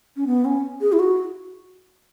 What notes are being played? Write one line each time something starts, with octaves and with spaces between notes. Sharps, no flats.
C#4
B3
C#4
G#4
E4
F#4